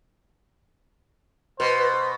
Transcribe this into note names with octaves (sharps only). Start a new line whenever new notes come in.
B2 B4 C5